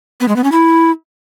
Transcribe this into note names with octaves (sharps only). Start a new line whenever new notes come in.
B3
G#3
B3
C#4
E4